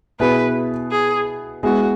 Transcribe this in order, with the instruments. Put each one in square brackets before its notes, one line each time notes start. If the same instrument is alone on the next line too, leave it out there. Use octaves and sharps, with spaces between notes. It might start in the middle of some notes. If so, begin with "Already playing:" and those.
[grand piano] B2 B3 E4 G#4 [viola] B4
[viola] G#4
[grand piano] G#3 B3 E4 G#4 [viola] F#4